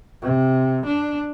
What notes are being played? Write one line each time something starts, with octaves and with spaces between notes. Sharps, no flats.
C3
D4